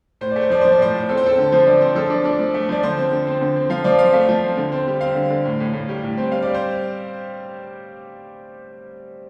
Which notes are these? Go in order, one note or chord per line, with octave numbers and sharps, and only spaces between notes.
A2 C5
A3 D5
C5
F3 D5
F3 C5
D5
A2 C5
A2
C4 A4
C5
C4 A4
D3
F3 C5
D3 D5
C4 C5
F3 A4
D4
D4
F3
A3
F3 D5
D3 C5
C4
D3
C4
D3
C4
F3 F5
F3 D5
C4 F5
A3 F5
F3
C4
D3
C4
G3
C4 F5
D3
D3
A2
A2
A2
G3
A2
C4
G3 F5
G3 D5
C5